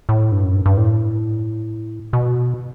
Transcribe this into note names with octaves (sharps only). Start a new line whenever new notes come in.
A2
G2
F#2
G2
G2
A2
B2